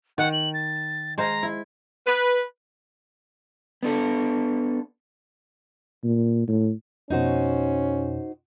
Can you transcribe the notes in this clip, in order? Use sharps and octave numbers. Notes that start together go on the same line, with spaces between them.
D#3 F#5
F#7
A6
G#3 C5 F5 A#5
E4
B4
B3 D4 A4
A#2
A2
F2 B2 C#4 D#4 F#4 C5